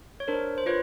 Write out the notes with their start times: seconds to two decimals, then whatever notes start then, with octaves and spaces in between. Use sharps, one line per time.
0.20 C#5
0.28 D4 A#4 C5
0.58 C5
0.66 F4 B4 C#5